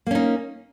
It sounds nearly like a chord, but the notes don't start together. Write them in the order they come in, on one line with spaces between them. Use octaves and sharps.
A#3 C#4 D#4